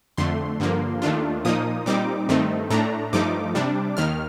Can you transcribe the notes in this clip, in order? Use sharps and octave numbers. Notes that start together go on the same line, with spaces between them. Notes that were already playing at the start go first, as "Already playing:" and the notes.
F2 D3 A3 C6
G2 D3 F3 A#3
D#2 D#3 A3 D4 F4
A#2 F3 A#3 D#4 D#6
A#2 G3 C4 D#4 D6
G2 D#3 A3 C4 D#4
A2 A3 D4 A#5
G2 F3 A3 D#4 D6
C3 G3 D4
D#2 D#3 F6